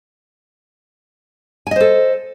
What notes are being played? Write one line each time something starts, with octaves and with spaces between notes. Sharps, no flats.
A4 C5 D#5 G#5